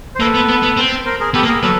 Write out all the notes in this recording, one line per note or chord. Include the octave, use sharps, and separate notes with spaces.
C5
A#3 A4 B4
B3
B3
B3
C4
A#4 C5
G#4 A#4
B3 G4 A4
A#3
G#4 A#4
F#3 A4 B4